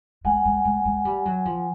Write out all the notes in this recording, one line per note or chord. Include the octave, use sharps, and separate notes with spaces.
G#3 F#5 G#5
G#3
G#3
G#3
G3
F#3
F3